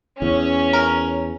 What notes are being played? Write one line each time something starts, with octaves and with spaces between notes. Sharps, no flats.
E2 C#4
A#4